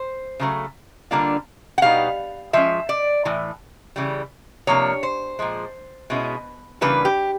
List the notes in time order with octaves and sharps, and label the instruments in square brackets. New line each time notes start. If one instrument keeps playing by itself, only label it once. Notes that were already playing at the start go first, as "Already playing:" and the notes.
Already playing: [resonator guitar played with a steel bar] C5
C#3 F#3 A3
D3 G3 A#3 D4 F4
F#5
B2 G3 B3 D#4 F5
F3 G#3 C#4 E5
D5
A2 E3
C#3 E3 G3
C3 F3 A#3 D4 C#5
C5
A#2 F3 G#3
B2 G#3 C#4 E4
C#3 E3 G3 A#3 D4 B4
G4